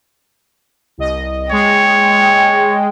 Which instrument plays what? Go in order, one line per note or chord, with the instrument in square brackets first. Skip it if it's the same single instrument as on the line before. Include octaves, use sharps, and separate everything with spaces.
[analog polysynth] C2 D#5
[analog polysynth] G#3 [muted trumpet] C#5 [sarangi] G5